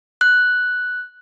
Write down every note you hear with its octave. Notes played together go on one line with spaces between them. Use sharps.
F#6